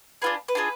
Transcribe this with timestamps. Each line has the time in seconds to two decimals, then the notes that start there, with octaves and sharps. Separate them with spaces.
0.22 D4 F4 G#4 B4
0.48 B4
0.55 D4 F4 G#4